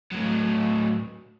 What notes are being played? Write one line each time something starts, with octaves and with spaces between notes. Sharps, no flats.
A2 F#3